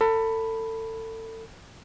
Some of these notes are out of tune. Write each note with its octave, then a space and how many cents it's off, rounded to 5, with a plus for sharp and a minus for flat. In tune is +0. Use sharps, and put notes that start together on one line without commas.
A4 +30 B5 +0